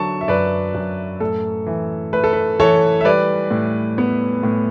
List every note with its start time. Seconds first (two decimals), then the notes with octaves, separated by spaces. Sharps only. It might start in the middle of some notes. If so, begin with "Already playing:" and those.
Already playing: D3 F#3 A5 C#6
0.21 E5
0.28 F#2 B4 D5
0.75 F#2
1.20 A2 A4
1.67 E3
2.13 A3 B4
2.24 A4
2.33 B4
2.60 E3 A4 C#5
3.01 E5
3.05 G3 B4 D5
3.51 A2
3.98 B3
4.43 A2